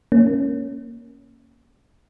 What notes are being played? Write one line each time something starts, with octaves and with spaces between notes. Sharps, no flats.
A#3 C#4